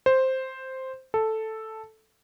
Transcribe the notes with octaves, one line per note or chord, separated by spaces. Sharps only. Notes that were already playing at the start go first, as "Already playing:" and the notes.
C5
A4